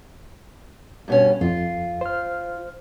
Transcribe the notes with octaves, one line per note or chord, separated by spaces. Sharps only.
G2 B2 C#4
F2 F4
C5 F6